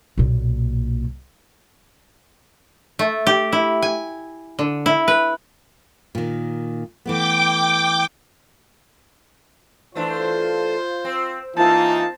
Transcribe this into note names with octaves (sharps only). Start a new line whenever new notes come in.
B1 A#2
A3
G4
E4
G#5
D3
E4
B4
A#2 D#3
E3 A3 B3 G5 D6
E3 A3 D4 F4 C5
C4
E3 A#3 C4 D#4 F4 A5